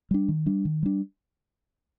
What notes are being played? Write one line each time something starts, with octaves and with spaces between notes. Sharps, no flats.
G3 D4
D#3
G3 D4
D#3
G3 D4